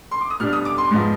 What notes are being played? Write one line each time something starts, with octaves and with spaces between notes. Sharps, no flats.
C6
D6
D#6
B2 G3 D4 F6
D#6
D6
C6
G#2 F3 B3 D#4